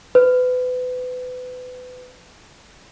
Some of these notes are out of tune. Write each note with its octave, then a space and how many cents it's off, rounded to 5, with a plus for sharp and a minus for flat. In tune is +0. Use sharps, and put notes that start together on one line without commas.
B4 +30